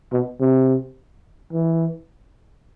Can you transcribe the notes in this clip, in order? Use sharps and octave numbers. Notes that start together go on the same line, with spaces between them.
B2
C3
E3